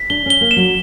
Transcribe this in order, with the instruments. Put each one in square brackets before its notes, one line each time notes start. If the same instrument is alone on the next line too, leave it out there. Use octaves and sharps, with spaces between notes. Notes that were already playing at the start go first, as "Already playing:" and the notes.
Already playing: [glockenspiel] B6
[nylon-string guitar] D4 [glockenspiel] G7
[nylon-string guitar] C#4 [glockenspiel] G7
[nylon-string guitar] A#3
[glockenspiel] E7
[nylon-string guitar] F#3